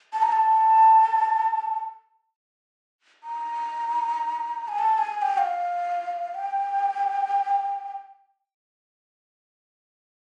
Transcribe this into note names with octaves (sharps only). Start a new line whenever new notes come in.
A5
A#5
A5
A#5
G#5
A5
G#5
G#5
G5
F5
G5